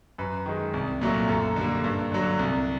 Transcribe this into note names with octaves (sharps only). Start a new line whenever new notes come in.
F#2 B4
D#3 G#3
C2
A#2 F#3 A3
F#2 A4
D3 G3 A#3
G2
D3 F#3
C2